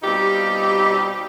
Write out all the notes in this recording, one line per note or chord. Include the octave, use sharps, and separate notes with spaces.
B2 G3 C4 D#4 F4 G4